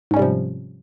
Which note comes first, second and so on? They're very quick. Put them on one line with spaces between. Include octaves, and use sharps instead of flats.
G#2 C#4 G3 C3 F3